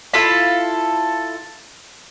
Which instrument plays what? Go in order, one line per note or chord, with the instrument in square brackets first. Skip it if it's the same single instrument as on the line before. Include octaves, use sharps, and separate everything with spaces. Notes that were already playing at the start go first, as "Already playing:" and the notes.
[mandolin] E4 F4 A4 B5